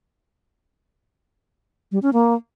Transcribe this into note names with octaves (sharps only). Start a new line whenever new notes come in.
G3
C#4
A#3